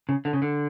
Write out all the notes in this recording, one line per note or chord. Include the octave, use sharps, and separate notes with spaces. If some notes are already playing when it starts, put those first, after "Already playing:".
C#3
D3
C#3
D3